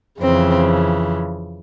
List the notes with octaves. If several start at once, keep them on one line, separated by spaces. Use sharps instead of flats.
F2 C#3 E3 C4